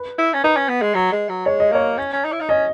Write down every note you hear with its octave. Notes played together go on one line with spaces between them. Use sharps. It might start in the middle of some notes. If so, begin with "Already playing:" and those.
Already playing: B4
E4
C#4
D#4 B4
C#4
B3
G#3
F#3
G#3
F#3
G#3 C#5
D#5
A#3 C#5
C#4
C#4
D#4
E4
D#4
C#4 D#5